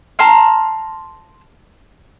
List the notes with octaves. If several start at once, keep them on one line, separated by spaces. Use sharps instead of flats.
A5 A#5 C6 F6